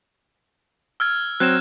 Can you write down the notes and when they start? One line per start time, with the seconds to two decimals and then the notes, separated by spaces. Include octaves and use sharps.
1.00 E6 F6 G#6
1.40 F#3 C4 F#6 G#6 E7